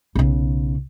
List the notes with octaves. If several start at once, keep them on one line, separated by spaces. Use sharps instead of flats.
B1 C#3